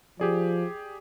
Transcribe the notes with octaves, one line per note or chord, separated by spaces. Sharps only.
F3 G4 G#4 D5